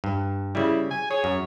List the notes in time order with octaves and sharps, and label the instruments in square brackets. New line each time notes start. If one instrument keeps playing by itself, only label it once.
[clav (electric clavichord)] G2
[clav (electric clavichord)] C#3 G3 [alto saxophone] E4
[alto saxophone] G#5
[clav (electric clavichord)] G#4 [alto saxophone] C#5
[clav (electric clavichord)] F#2